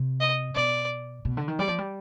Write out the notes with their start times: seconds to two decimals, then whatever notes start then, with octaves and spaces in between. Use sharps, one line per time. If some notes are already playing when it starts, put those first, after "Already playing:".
Already playing: C3
0.20 D#5
0.55 B2 D5
1.25 B2
1.37 D3
1.48 D#3
1.59 G3 D5
1.68 F3
1.78 G3